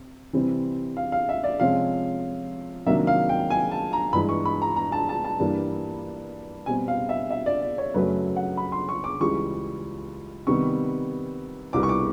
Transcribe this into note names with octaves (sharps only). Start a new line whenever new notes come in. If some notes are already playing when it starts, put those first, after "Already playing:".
Already playing: C3
C3 E3 G3 C4
F5
F5
E5
D5
C3 F3 G#3 C#4 F5
C3 D#3 F#3 A#3 D4 E5
F5
G5
G#5
A5
A#5
G2 E3 G#3 B5
C#6
B5
A#5
A#5
A5
A5
A5
G2 E3 G3 A#3 D4
B2 G3 C4 G#5
F5
E5
E5
D5
D5
C#5
F#2 C#3 F#3 A3 C#4 B4
F#5
B5
C6
C#6
D6
C#2 C#3 E3 G3 C#6
C3 D#3 G3 B3 C#6
C2 B2 G3 B3 D6
C#6
D6